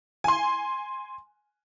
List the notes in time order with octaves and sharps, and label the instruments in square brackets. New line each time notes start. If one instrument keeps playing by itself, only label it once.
[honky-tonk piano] G#5 C6